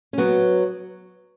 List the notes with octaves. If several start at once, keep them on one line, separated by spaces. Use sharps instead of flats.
C#4
F#3 B3